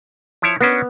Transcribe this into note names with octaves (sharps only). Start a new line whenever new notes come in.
F3 E4 C#5
B3 C#4 D4 F#4